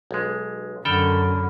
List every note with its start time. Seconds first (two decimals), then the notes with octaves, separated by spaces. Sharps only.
0.11 B1 G#3
0.85 F#2 D3 A4 G5 B5 F6